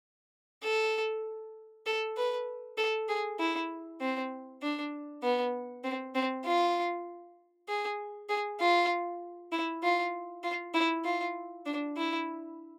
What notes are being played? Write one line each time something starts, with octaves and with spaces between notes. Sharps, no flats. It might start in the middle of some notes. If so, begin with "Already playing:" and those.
A4
A4
B4
A4
G#4
E4
C4
D4
B3
C4
C4
F4
G#4
G#4
F4
E4
F4
F4
E4
F4
D4
E4